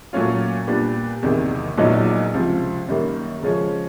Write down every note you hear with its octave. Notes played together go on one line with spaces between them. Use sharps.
A#2 F#3 A3 C#4 F4
A#2 G3 B3 D4 G4
F#1 E2 C3 D#3
A#1 A#2 F#3 B3 D#4
C#2 C3 F3
F#2 D#3 G3 A#3
C#3 F3 G#3 C#4